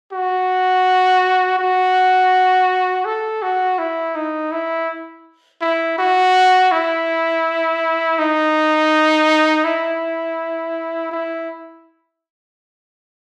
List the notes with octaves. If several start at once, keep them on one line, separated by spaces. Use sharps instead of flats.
F#4
F#4
A4
F#4
E4
D#4
E4
E4
F#4
E4
D#4
E4
E4